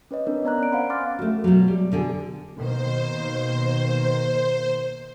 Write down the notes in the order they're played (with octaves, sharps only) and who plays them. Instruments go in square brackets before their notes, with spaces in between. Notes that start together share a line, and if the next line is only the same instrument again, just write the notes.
[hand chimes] C#4 B4 C#5 D#5
C4 D4 A#4
B3 D5 A#5 F#6
C#4 D7
C5 F5 F#5 B5
G#5 C6 D6 F6 A6
[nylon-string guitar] A3 F#4
B2 F#3
G3
B2 D3 G#4
[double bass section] B2 D#3 A#3 [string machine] C5